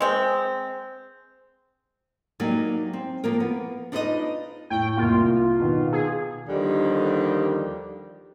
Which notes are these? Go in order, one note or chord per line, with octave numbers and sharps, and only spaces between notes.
G#3 C4
F#3 A#3 D#4 G4 D5 G#5
C4
F3 A#3 A#4
B3
D4 D#4 F4 B4 D5 D#5
A2 G5
C2 A#3 F4
B2 D#3
G#4
D#2 D3 D#3 F3 G3